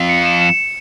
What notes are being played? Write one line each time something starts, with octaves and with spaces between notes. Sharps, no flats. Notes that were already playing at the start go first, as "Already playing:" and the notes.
Already playing: F2
C#7
E7
E7